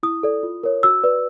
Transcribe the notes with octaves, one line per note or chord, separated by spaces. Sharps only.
E4 D#6
A4 D5
F4
A#4 C#5
F#4 E6
B4 D5